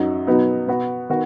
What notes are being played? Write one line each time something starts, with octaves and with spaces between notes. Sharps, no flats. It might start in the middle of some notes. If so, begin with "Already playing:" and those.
Already playing: F#2 F#3 D#4 F#4
B2 F#3 B3 D#4
B2 B3 F#4
D#3 B3 F#4